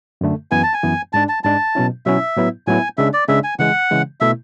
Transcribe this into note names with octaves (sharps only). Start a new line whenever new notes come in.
F#2 D3 A3
F#2 E3 B3 G#5
A5
G#5
F#2 E3 B3
G#2 G#3 D4 A5
A5
G#2 G#3 D4 A5
B2 F#3 C#4 E4
B2 F#3 C#4 E4 E5
A2 F#3 B3 E4
A2 F#3 B3 E4 G#5
C#3 G#3 D4 E5
D5
C#3 G#3 D4 E5
G#5
C#3 E3 G#3 F#5
C#3 E3 G#3
B2 A3 E4 E5